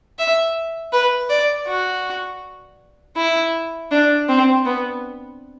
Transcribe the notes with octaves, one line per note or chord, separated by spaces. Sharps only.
E5
B4
D5
F#4
E4
D4
C4
B3